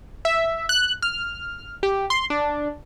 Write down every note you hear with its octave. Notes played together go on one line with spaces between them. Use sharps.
E5
F#6
F6
G4
C6
D4